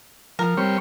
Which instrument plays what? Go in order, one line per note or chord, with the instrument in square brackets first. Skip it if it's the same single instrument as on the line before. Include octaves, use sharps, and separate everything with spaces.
[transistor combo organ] F3 [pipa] A#4
[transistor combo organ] G3 C4 C#5